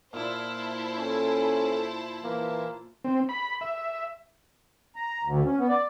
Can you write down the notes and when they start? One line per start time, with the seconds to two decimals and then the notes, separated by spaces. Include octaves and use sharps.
0.13 A#2 E4 C5 A5
0.98 C#4 A4
2.24 E3 A#3
3.04 C4
3.29 B5
3.61 E5
4.96 A#5
5.22 D2
5.44 C#4
5.58 B3
5.69 D5